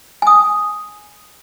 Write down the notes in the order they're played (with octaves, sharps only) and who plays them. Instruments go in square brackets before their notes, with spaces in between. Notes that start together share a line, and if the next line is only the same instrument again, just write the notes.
[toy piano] G#5 D#6